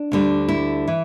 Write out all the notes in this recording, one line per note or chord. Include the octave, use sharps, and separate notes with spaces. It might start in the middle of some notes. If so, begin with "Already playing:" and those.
Already playing: D4
D2 D3 G3
E4
E3